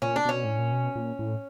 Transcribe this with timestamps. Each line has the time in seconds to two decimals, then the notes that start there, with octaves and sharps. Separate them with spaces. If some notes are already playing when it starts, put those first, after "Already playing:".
0.02 A#2 C#4
0.16 D4
0.25 B2 C#4
0.44 A2
0.59 A#2
0.72 B2
0.96 A#2
1.19 A2